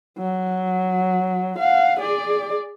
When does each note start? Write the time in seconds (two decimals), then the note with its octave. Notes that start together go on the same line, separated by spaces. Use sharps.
0.18 F#3
1.59 F5 F#5
2.00 G#4 D5